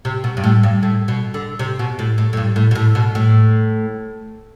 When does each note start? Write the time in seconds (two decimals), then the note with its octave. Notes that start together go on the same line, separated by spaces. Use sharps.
0.05 C3
0.24 B2
0.37 G2
0.44 A2
0.63 G2
0.83 A2
1.08 B2
1.34 D3
1.59 C3
1.79 B2
1.99 A2
2.18 A2
2.33 A2
2.37 G2
2.56 A2
2.71 B2
2.75 A2
2.95 B2
3.15 A2